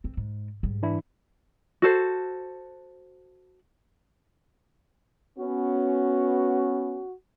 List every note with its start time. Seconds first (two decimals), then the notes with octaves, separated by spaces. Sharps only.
0.04 E2 C4
0.17 G#2
0.63 G#2 G3
0.83 E3 D4 E4
1.82 F#4 A4 C5
5.39 B3 C#4 F#4